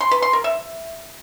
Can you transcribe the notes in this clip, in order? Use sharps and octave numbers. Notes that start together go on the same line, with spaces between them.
C6
B4
C6
A#4
E5